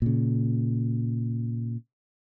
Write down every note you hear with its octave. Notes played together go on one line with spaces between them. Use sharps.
A#2 C#3